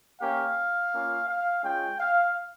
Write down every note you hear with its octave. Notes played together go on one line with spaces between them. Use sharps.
A#3 C#4 G4 F5
A#3 C#4 F4
F5
G#3 C#4 F4 G5
F5